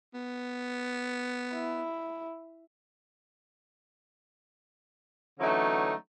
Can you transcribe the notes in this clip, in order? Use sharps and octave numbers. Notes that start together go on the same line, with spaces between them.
B3
E4
D3 E3 F#3 A3 C#4 D#4